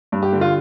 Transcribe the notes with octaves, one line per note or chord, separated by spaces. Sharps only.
G2
G4
D3
F4